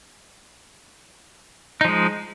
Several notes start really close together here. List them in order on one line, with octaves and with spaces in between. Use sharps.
D#4 F3 G#3